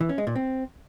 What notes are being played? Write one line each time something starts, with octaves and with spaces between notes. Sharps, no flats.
E3
C#4
G#3
A#2
C4